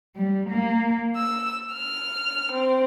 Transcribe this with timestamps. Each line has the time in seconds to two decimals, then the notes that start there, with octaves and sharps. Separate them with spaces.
0.16 G3
0.50 A#3
1.15 E6
1.71 F6
2.51 C4